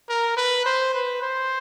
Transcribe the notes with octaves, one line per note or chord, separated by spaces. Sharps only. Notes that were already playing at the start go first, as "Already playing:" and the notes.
A#4
B4
C5
B4
C5